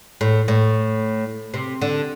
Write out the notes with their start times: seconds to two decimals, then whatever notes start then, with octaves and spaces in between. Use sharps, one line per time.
0.21 A2
0.48 A2
1.54 C3
1.81 D3